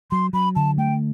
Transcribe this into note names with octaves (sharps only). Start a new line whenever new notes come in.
F#3 C6
F#3 B5
D3 A5
A3 G5